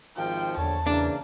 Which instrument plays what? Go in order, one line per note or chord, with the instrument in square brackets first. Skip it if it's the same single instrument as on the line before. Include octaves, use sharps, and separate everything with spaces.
[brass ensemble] G#1 D#3 F3 [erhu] G5
[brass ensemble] A#1 D3 C#5 [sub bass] E2 [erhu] A5
[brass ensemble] C#3 E3 A#3 [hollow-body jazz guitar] D4